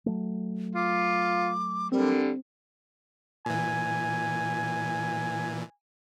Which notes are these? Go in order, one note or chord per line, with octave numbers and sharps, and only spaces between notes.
F#3 A3
F4 D6
D3 G3 C4 A#4
A#2 E3 G#5